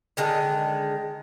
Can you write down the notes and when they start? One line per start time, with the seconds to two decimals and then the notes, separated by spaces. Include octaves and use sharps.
0.17 D3 D#3 G#3